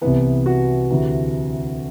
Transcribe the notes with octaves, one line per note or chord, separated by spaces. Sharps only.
C2 C3 E3 B3
F#4
D2 C3 E3